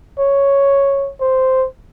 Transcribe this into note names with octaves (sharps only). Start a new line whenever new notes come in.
C#5
C5